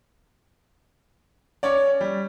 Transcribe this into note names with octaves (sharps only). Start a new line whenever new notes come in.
C#4 C#5 D5
G3